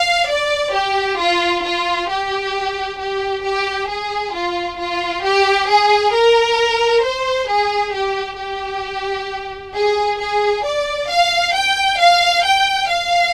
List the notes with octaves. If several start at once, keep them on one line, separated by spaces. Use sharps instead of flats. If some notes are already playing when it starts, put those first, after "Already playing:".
Already playing: F5
D5
G4
F4
F4
G4
G4
G4
G#4
F4
F4
G4
G#4
A#4
C5
G#4
G4
G4
G#4
G#4
D5
F5
G5
F5
G5
F5